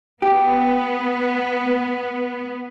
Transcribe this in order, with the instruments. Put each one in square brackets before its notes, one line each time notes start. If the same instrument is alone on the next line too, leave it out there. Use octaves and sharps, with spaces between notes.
[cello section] B3 [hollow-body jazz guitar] G4